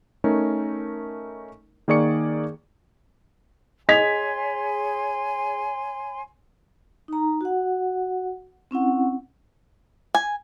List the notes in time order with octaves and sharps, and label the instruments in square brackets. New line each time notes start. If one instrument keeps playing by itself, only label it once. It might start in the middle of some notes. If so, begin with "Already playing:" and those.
[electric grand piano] A3 C#4 D#4 A#4
D#3 A#3 G#4 D5 C#6 C#7
[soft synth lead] G#4 [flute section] C#5 G#5 C6 [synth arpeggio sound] D#5 [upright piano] G#6 B6 F7
[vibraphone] D#4 A#5
F#4 F#5
C4 C#4 E4 F#5
[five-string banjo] G#5